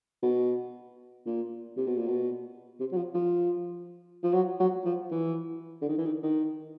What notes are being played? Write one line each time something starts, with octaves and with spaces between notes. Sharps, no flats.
B2
A#2
C3
B2
A#2
B2
C3
F#3
F3
F3
F3
F#3
F#3
F3
E3
D3
D#3
E3
D#3
D#3